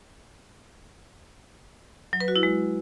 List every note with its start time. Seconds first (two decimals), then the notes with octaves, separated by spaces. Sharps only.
2.13 F#3
2.21 B4
2.28 F#4
2.36 E4
2.43 G#3